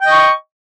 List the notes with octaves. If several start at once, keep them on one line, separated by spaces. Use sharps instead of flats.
D#5 G5 C#6